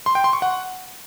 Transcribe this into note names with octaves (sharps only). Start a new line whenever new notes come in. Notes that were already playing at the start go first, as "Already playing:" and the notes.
C6
G5
C6
C#6
F#5